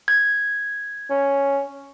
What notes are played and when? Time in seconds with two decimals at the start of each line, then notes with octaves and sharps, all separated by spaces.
0.08 G#6
1.10 C#4